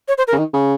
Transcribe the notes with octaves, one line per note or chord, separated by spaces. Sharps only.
C#5
C5
A#4
C#3
D#3
C#3